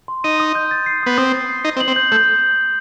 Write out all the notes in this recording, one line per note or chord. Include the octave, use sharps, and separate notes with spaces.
C6
D#4 D#7
D#6
G6
A6
C7
B3 D#6
C4 D#6
A6
C7
D#4 C7
C4
F#7
C4
G6
A3 G6